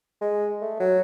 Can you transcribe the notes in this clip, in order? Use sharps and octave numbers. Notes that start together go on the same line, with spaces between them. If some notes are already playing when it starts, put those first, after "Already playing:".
G#3
A3
F#3